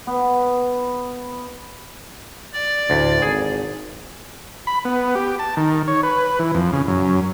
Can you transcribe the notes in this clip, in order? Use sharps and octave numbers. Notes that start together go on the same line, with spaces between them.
B3
D5
D2 A2
G#1 G#4
B5
B3
G4
A5
D#3
C#5
B4
E3
F2
C#3
F#2